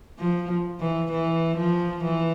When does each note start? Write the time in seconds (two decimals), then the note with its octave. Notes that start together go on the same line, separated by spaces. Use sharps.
0.19 F3
0.80 E3
1.11 E3
1.57 F3
2.04 E3